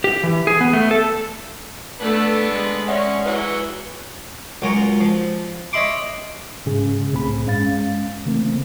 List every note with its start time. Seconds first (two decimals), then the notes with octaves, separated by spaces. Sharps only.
0.04 G4
0.23 E3
0.47 G#4
0.61 B3
0.73 A3
0.91 A4
2.01 A3 B3 D4 A4 B4
2.51 G#3
2.88 C#4 D5 E5 F#5
3.26 E3 F#3 F#4 B4
4.62 C#2 F#3 F4 A#4 G#5 C#6
5.00 F3
5.73 C#5 D#5 E5 B5 C6 D6
6.66 G#2 C#3 C#4 G#4
7.12 C2 A2 C4 G#4 B5
7.45 G2 G#3 C#4 F5 A6
8.26 C#3 E3 A3 A#3 C4